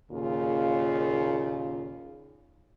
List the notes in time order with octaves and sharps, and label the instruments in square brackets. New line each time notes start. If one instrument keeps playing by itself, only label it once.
[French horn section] D#2 A#2 C#3 F4